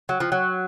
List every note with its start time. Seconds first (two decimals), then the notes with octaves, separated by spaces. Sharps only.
0.09 F#3
0.20 F3
0.32 F#3